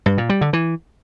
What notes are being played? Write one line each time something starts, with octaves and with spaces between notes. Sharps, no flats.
G2
A#2
G3
D3
E3